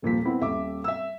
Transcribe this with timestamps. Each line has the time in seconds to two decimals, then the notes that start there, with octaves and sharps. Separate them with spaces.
0.02 D#1 A#2 F3 B6
0.25 B3 C4 E4
0.41 D#1 E5 D6
0.84 E5 E6